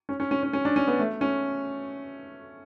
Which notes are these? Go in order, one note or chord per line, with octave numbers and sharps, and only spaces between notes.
C#4
C#4
C#4
C#4
C#4
D4
C#4
B3
A3
C#4